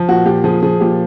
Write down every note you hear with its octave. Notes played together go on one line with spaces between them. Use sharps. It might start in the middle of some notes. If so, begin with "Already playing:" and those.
Already playing: F3
A#2 F#4
A#2 G4
F3 G#4
F3 G#4
A#2 G4